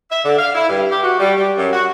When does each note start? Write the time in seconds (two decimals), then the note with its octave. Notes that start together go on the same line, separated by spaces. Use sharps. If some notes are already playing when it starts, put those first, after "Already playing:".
0.10 E5
0.25 D3
0.39 F5
0.55 E4
0.69 G2
0.91 G4
1.03 F#4
1.20 G3
1.37 G3
1.57 F#2
1.73 F#4